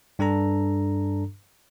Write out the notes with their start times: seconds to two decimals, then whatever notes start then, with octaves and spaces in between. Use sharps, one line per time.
0.19 G2 D4 A4 A#5